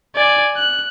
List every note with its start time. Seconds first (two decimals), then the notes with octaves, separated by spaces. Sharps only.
0.16 D5 G#5
0.56 F#6